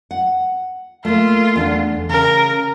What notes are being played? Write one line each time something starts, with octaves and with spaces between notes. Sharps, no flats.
F#5
A3 A#3 F4
E2 D4 A4
C#3 A#4